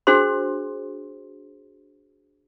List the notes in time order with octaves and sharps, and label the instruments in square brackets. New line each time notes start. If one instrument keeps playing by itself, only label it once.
[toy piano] D4 F#4 G#4 C5 C6